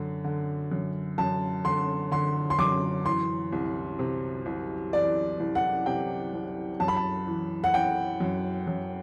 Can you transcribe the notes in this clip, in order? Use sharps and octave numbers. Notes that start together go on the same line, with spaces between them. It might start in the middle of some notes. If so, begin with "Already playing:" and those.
Already playing: F#2 D3
D3
F#2
F#2 A5
D3 C6
D3 C6
C6
F#2 D6
E3 C6
C2
C3
C2
E3 D5
C2
F#5
C3 G5
C2
F#2 A5
B5
A5
E3
F#5
E3 G5
F#2
F#2